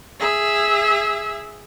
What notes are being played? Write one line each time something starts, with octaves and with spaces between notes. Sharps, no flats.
G#4 E5